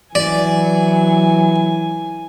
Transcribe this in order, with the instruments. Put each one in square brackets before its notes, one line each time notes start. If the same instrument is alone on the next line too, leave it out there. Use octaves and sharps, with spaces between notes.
[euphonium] E3 [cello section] F#3 [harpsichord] D5 [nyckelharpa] G#5